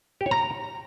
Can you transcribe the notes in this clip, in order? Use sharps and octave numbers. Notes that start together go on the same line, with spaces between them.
G4
C#5
A#5